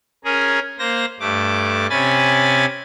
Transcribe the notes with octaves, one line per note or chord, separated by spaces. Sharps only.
C#4 G#4 A#4
A#3 C5 A#6
G2 A3 D6
C3 C#4 G#5 B5 A6